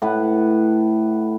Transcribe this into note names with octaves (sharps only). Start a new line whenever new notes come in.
A2 B4 F#5